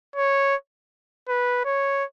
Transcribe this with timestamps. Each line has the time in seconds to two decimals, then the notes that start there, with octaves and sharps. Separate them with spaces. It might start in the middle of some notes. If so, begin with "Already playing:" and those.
0.16 C#5
1.29 B4
1.65 C#5